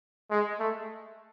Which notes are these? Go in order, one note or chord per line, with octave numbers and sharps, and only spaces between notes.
G#3
A3